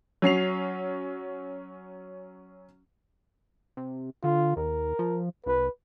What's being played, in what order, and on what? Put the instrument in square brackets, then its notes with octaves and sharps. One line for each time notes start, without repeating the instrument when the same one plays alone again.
[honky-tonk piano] F#3 C#4 C7 F7
[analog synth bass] C3
[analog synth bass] D3 [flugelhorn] F4
[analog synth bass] D#2 [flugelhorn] A#4
[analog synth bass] F3
[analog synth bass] C2 [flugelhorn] B4